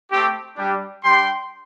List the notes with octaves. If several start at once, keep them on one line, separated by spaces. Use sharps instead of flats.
A3 C4 G4
G3 D4 G4
G3 D4 G4 G5 C6